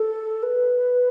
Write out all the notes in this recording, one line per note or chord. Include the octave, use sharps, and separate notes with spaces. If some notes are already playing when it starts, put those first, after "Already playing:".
Already playing: A4
B4